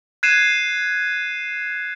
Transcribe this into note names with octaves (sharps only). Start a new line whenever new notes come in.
F#6 G#6 C7 D#7 E7